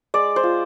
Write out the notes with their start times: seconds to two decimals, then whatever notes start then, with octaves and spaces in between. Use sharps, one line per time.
0.14 G#3 D5
0.36 C5
0.43 F4